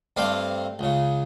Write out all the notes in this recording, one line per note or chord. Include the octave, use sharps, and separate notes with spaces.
G2 A3 C4 F5 D6
C#2 C#3